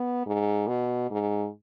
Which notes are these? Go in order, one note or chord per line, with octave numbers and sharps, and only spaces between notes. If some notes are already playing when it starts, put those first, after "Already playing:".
Already playing: B3
G#2
B2
G#2